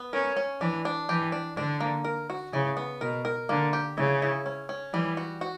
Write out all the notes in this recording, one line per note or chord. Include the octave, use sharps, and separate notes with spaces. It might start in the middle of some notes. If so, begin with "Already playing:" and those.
Already playing: B3
C#4 A#4
C#4
E3 D4
D4
E3 G4
D4
D3 D4
A#3
A#4
F#4
C#3 E3
B3
B2 A#4
A#4
D3 A#3
G4
C#3 E4
E4
C#4
C#4
E3 G3
F#4
F#4